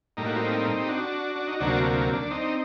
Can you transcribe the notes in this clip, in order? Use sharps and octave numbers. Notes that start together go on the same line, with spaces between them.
A2 G3 A#3 D#4
F#4
C4 D#4
G4
D4 F#4
D4
D#4
D2 C3 F#3 A#3 D4 F#4
D4
C4 D#4